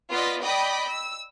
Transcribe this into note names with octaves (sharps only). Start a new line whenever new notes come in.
B3 F4 D5 D#5 A6 B6
D5 D#5 G5 B5 D6 D#6
E6